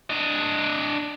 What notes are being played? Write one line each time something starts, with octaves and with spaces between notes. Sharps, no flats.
D4 D#5